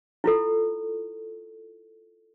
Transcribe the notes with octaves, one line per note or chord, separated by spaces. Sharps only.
E4 F4 A4